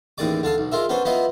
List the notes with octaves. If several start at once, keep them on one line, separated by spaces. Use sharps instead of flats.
A1 D#2 A#3 G#4 D5 D6
D3 D4 F5 A5
B1
G#3 F4 A#4 E5
B3 C#4 D4 C5
F3 B3 E4 D#5 F5